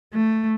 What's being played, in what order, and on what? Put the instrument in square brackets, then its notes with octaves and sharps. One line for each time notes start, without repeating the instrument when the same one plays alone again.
[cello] A3